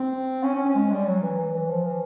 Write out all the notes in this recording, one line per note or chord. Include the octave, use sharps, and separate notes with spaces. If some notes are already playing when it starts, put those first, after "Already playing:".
Already playing: C4
C#4
C#4
C#4
G#3
G3
F#3
E3
E3
E3
F3
E3